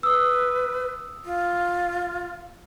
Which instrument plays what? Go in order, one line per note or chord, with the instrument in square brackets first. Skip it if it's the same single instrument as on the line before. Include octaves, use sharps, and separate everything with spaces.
[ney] B4 [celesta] D#6 E6
[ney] F4